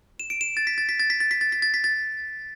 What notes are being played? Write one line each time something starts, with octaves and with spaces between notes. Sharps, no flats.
E7
D7
E7
A6
B6
A6
B6
A6
B6
A6
B6
A6
B6
A6
B6
A6